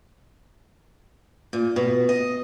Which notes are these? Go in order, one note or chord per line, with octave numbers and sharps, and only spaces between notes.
A#2
B2
D#5